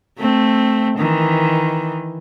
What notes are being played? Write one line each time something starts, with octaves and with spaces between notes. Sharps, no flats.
A3 C4
D#3 E3